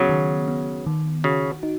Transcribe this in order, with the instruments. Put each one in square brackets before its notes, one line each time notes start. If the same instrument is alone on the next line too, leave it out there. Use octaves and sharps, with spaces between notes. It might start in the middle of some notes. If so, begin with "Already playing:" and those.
Already playing: [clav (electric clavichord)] C#3 F#3 [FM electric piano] B3
[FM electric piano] D#3
B3
D#3
[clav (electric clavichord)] C#3 [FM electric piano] F#4
[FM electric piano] D#4